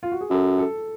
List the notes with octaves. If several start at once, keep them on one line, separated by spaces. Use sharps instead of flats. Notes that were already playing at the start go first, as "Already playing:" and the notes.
F4
F#4
G#4
F#2 A4
A4